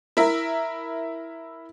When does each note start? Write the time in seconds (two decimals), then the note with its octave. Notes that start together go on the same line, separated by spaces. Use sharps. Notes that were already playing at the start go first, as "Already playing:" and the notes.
0.17 E4 A#4 E5